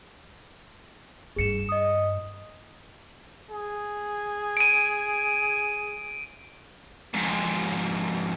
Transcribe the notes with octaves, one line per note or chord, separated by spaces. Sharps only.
G2 D4 G#4 C#7 E7
D#5 D#6
G#4
D7 D#7
F2 G#2